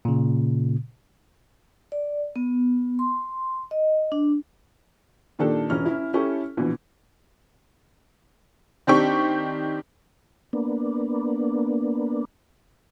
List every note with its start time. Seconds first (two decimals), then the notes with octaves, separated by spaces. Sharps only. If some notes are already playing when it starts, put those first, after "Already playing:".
0.05 A#2 C#3
1.92 D5
2.36 B3
2.99 C6
3.71 D#5
4.12 D4
5.39 A#2 D#3 D4 G4 A4
5.70 E1 C#4 F6
5.86 C#4 E4
6.14 C#4 E4 G4 A4 C#6
6.57 A#1 B2 E3
8.87 D#3 C4 D4 G4 C#6
10.53 A#3 B3 D4